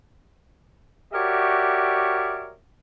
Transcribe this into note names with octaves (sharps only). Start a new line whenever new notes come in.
F#4 G4 A#4 C#5 D5 E5